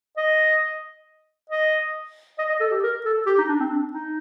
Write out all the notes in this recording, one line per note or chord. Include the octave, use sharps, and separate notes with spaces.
D#5
D#5
D#5
D#5
A4
G4
A#4
A4
G4
D#4
D4
C4
D4
D#4